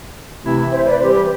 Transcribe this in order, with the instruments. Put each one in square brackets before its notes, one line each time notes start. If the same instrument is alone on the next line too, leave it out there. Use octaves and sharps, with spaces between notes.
[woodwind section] C3 E3 A3 C4 E4
[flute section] C5 E5
B4 D5
[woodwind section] E3 G3 C4 G4 [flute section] C5
[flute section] B4